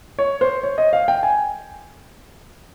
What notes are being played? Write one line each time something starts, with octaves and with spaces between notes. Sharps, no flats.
C#5
C5
C#5
D#5
F5
G5
G#5